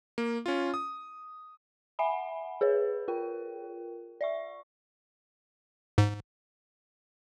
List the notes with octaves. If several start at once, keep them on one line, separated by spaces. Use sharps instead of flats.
A#3
C#4 F4
D#6
E5 F#5 G#5 B5
G#4 B4 C#5
F4 A#4 G5
D5 E5 C#6
G#2